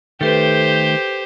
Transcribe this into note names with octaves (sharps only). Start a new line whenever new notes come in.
D#3 A3 G4 A4 B4 C5